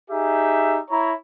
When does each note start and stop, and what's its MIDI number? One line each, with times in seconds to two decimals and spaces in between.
0.11 0.79 63
0.11 0.79 67
0.11 0.79 68
0.11 0.79 76
0.90 1.12 64
0.90 1.12 73
0.90 1.12 82